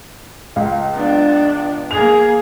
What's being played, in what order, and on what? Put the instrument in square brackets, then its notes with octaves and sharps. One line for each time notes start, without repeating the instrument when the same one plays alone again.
[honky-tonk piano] C#2 F5
[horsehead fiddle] B3 D4
[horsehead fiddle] A#3 G#4 [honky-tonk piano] F7